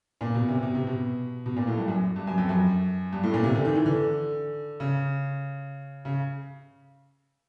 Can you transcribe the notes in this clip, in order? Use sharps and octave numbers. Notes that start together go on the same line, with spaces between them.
A#2
B2
C3
B2
C3
B2
B2
A#2
A2
G2
F#2
G2
F#2
F2
F#2
G2
A2
A#2
C3
D3
D#3
E3
D3
C#3
C#3